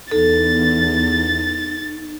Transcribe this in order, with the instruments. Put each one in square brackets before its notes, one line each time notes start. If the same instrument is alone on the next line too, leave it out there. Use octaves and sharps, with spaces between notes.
[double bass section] E2 [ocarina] D#4 [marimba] A4 [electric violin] A6